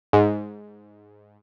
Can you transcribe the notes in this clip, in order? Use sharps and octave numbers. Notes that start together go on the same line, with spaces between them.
G#2